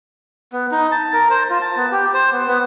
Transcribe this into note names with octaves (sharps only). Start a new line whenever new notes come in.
B3
D#4
A5
A#4
C5
F4
A5
B3
G4
C5
B3
B3